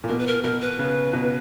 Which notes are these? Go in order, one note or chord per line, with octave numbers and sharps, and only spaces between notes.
A#2
B2 A#4
B4
A#4
B2 A#4
B4
C#3
B2